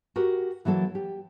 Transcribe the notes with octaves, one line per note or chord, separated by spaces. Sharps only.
F#4 G4 A#4
E3 F#3 A#3 A4
G4